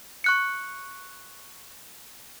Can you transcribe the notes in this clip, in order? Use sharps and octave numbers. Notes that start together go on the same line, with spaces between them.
C#6 F#6 C#7